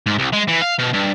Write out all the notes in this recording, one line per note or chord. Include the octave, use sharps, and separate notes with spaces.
G#2
C2
G#3
E3
F5
B2
G2